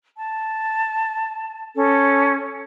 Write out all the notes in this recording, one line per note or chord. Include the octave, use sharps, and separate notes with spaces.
A5
C#4 A4